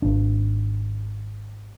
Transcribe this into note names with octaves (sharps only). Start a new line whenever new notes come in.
G#1 D4